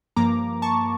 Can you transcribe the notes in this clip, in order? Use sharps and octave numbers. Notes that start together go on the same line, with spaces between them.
G2 F3 A#3 A#5 D6
A5 C#6